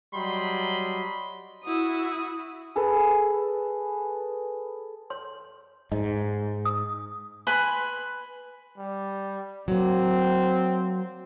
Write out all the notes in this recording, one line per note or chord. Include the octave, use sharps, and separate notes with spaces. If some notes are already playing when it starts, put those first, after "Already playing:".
F#3 G3 D#5 B5 C6
E4 F#4 D#6
G#4 A4 B4
C#5 C6
G#2 D#5
D#6
B4 G#5 B5 C6
G3
F#3 A#3 C4